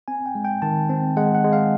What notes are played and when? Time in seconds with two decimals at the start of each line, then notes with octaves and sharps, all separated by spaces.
0.08 C4 G#5
0.26 G5
0.35 G#3
0.45 G5
0.62 D#3 A5
0.89 C4
1.16 G#3 F#5
1.35 F#5
1.44 G#3
1.53 F5